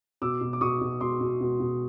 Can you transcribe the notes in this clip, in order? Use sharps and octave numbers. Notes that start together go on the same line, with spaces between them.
B2 D6 E6
B2
D6
B2 C#6 D#6
B2
B2 C6 D6
B2
B2
B2